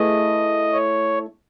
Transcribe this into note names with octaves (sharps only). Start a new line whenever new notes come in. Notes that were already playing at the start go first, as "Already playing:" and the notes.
Already playing: A3 E4 G#4 B4 D#5
C#5